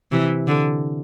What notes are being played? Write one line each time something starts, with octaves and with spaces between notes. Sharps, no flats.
C3 E3
D3